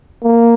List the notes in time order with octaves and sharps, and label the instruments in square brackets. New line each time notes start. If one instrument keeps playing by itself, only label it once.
[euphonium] A#3